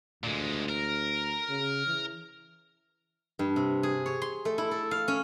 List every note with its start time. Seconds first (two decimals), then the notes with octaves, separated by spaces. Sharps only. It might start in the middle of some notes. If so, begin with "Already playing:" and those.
0.24 D2 A#2 G#3
0.69 A#4
1.49 C#3
1.87 E3
3.39 G2
3.56 C3
3.83 G#4
4.06 C#5
4.22 C6
4.45 A3
4.58 E4
4.71 A4
4.91 F5
5.08 C#4